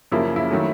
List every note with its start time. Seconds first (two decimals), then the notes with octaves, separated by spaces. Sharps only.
0.12 F#2 C#3 F3 A#3 E4
0.36 E4
0.51 D#3 F#3 A3